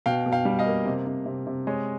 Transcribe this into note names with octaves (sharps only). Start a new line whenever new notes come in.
B2 F5 G5
B2
F5 G5
G3
D#5 F5
A#3
C3
C3
C3
C3
G#3 C#5 D#5